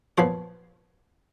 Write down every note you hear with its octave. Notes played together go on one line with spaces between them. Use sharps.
A#2 F3 B3 C#5